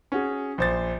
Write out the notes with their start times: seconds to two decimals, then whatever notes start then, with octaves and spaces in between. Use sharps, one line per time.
0.12 C#4 F#4 G#4
0.58 A#1 C5 A6